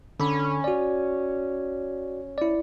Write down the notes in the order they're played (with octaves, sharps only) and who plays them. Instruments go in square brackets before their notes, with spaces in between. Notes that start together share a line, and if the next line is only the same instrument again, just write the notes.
[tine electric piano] D3 B5 [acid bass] C#4
[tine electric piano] F#4 D5
E4 D5